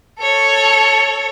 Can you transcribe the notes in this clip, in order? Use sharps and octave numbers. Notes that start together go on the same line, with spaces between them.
A4 C#5